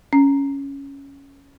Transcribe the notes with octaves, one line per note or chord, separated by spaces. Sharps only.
C#4